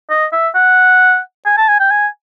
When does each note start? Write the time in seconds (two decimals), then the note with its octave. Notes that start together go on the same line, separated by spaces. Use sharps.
0.10 D#5
0.32 E5
0.55 F#5
1.46 G#5
1.58 A5
1.68 G#5
1.80 G5
1.91 G#5